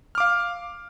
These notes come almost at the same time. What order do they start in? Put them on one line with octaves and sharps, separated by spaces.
F6 D6 F5